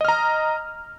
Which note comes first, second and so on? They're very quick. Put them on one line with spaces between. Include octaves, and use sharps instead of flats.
D#5 F6 A#5